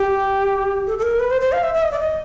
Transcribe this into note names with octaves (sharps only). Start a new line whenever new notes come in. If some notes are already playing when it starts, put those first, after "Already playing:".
Already playing: G4
A4
A4
A#4
B4
C5
C5
F5
E5
E5
D#5
D5
D#5